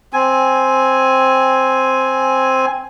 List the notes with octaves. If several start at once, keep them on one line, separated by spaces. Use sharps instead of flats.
C4 G#5